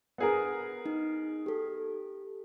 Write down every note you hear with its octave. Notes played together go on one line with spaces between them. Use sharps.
B3 G#4 A#4
D#4
G4 A4